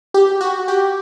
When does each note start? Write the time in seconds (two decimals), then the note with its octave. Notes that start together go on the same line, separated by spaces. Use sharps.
0.14 G4
0.41 F#4
0.68 G4